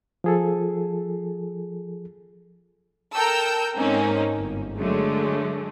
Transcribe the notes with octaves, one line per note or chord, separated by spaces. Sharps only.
F3 G#4 A4
A4 A#4 G5 A#5 E6 G6
G#2 A#3 C4 C#4 D#4
G1
D3 F#3 G#3 A3